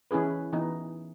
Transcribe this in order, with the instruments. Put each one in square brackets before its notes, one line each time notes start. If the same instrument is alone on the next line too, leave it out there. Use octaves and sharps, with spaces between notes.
[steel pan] E3 C#4 E4 G#4 B4
E3 B3 D#4